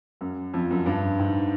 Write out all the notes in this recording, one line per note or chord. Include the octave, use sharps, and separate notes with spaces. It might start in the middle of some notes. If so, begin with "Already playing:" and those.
F#2
F2
F#2
G2
G#2